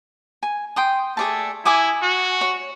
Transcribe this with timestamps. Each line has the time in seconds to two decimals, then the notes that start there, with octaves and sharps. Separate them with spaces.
0.43 G#5
0.76 G5 C6 D#6
1.17 A3 G#4 D5 A5
1.65 E4 G#5 D6 D#6
2.02 F#4
2.41 C#5